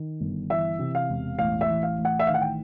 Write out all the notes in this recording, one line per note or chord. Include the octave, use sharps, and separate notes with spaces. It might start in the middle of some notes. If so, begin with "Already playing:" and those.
Already playing: D#3
G1
E3 E5
C3
F5
E1
A1 F5
E5
E3
F5
A1
F#5
E5
D#3 F5
F#5
G5